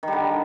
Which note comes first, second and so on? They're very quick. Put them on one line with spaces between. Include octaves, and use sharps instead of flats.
D#3 G3 D3